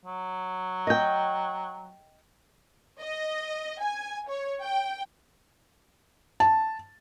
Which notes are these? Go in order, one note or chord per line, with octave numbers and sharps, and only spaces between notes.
F#3
D#5 G5
D#5
G#5
C#5
G5
A5